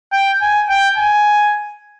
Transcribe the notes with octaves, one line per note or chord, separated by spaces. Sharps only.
G5
G#5
G5
G#5